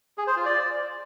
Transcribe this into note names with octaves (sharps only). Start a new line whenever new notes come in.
G#4
C5
F4
D5